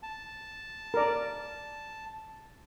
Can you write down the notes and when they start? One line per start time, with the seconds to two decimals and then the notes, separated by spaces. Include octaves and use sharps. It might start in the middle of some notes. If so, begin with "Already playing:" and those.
0.03 A5
0.94 A#4 D5